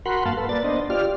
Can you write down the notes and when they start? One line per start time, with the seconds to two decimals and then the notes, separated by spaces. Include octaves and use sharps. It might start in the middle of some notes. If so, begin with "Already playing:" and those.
0.06 F#4 A#4 F#5 B5 C6
0.25 G2 A#3 F5 A5
0.37 A4 B4
0.49 A#3 B4 D5 A6
0.64 B3 D4 C5 D#5
0.90 F4 G4 D5 F6